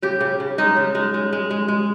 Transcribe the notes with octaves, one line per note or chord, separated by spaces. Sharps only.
C#3 G4
C#3
C#3
G#3 D#4
C#3
G#3
G#3
G#3
G#3
G#3